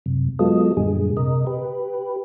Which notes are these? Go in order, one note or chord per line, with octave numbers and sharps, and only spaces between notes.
F#2 C3
F#3 G#3 B3 F4 A4 D#5
F#2 A#2 D3 G3 G#4
C3 A#4 D#5
G4 B4